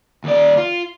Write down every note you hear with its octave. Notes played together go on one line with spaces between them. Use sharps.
D#2 D5
F4